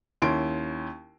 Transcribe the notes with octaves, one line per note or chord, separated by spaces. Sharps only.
D#2 C#4 E4 C6 D7